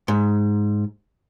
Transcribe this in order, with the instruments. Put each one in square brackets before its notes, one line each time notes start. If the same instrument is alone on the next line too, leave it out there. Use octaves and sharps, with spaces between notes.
[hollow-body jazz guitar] G#2